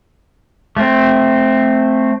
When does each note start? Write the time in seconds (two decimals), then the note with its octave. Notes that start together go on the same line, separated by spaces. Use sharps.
0.77 A3 C4